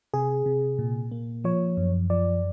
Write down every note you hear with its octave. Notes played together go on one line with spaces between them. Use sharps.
C3 G#4
C3
A#2
A#3
F3 C#5
F#2
F3 D5